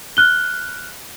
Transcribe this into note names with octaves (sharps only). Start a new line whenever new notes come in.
F6 F#6 G7